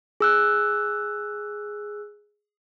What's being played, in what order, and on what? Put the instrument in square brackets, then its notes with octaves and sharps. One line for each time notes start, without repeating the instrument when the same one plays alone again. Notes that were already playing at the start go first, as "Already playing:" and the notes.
[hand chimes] G#4 E6 F#6